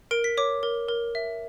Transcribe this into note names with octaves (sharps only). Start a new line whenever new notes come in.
A#4 D7
B6
C#5 D6
A#4
A#4
E5